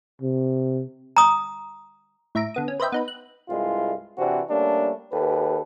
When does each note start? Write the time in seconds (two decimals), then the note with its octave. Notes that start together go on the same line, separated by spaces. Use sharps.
0.22 C3
1.17 A#5 D#6
2.35 A2 E4 E5 A#5 D7
2.54 D3 B3 D#6
2.68 C#4
2.80 B4 C5 D#5 E5 G5
2.92 B3 D#4 B4
3.08 F#6
3.49 C2 G2 G#3 E4 F4
4.18 C3 E3 C4 D4 F#4
4.50 G3 A3 A#3 C#4 D4
5.13 D#2 G4 A4 B4